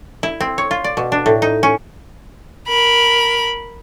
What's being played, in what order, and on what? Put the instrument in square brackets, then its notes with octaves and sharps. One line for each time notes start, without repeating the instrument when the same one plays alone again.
[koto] E4
C4
C#5
F4
D5
B2
D4
A2
D#4
C#4
[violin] A#4 B5